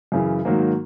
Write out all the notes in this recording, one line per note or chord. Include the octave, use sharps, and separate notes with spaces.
F#2 C#3 E3
G#2 D#3 F#3 A#3